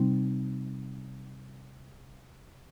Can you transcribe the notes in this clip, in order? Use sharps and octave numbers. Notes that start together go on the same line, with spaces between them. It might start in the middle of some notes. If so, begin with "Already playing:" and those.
Already playing: C3 G3 C4 D#4